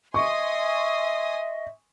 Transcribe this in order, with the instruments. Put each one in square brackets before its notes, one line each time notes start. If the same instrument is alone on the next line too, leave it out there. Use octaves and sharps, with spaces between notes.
[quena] D#5 [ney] E5 [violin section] G#5 C6 D#6 [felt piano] C#6